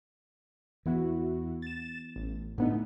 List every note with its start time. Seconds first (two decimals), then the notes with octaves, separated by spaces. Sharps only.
0.86 E2 E3 B3 E4 F#4
1.62 A6 E7
2.16 A1
2.58 A2 D3 A3 B3 D#4